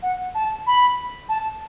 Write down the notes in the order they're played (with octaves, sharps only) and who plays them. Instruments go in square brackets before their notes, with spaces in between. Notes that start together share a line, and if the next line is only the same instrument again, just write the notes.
[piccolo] F#5
A5
B5
A5